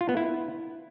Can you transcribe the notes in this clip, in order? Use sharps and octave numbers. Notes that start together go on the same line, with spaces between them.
F4
B3
E4